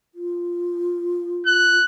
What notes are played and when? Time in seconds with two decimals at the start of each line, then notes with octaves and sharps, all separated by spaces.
0.15 F4
1.47 F#6